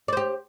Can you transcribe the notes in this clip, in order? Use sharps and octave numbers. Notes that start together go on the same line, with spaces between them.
G4 C5 D5